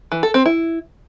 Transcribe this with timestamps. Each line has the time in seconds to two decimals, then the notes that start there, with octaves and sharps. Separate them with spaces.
0.12 E3
0.23 A4
0.34 C4
0.46 E4